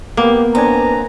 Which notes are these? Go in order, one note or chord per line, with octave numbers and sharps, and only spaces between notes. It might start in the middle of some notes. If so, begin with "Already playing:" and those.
A#3 B3 G4
B3 C4 D4 G#5 A#5